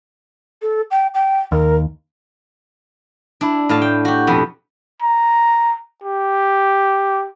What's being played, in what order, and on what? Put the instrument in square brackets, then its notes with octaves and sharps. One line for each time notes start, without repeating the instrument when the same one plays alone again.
[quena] A4
G5
G5
[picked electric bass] D#2 [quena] A#4
[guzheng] D4 E4
A2 F5 A5
G5
F#4 G4
F2 B2 B3
[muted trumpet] A#5
G4